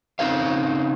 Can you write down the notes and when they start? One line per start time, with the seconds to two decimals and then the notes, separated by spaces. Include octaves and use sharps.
0.19 C#3 C4 D#4 A#4 C5 F5